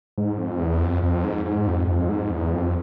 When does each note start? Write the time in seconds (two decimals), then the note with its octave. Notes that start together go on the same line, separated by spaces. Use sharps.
0.18 G#2
0.38 F2
0.60 E2
0.81 F2
1.03 F2
1.24 G#2
1.45 G#2
1.67 F2
1.87 F2
2.09 G#2
2.31 E2
2.53 F2